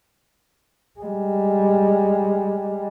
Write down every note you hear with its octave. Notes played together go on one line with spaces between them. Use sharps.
G3 G#3